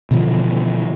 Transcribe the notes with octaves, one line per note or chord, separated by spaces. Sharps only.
B2 D3 E3 F3